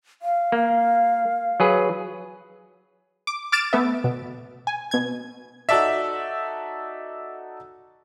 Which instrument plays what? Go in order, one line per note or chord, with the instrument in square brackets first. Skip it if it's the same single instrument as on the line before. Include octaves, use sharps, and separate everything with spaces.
[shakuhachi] F5
[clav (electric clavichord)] A#3
F#3 G#4 B4
[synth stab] D6
D6 F6 A6 D7 E7
A3 B3 E5
B2
G#5
B2 G#6
[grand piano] D#4 F#4 A4 D5 E5